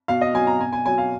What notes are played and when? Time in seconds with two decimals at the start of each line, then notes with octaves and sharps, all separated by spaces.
0.08 B2 F5
0.21 D#5
0.34 F#3 G#5
0.47 A#5
0.59 B2 G#5
0.73 G#5
0.86 F#3 G#5
0.98 F5